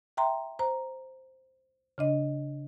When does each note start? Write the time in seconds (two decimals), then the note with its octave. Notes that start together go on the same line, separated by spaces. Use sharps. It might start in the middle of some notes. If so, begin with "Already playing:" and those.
0.17 E5 G5 A#5 C6
0.59 C5 A#5
1.98 C#3 D4 D#5